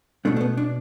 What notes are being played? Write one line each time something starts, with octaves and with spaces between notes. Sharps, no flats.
B2 A3 D4
A3
B3
D4